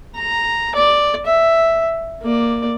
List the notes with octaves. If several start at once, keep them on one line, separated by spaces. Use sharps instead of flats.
A#5
D5
E5
A#3 D5